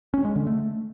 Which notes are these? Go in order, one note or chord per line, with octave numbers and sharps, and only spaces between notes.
C#4
G#3
D3
A3